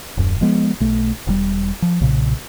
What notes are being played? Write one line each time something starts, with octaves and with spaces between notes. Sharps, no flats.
D#1 F#2
F3 G#3 B3
B1 A3
E1 C3 G3
F3
B1 A#2 C#3